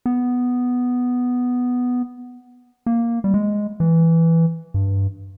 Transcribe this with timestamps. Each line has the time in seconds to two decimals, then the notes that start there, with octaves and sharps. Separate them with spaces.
0.06 B3
2.86 A#3
3.24 G3
3.34 G#3
3.80 E3
4.74 G2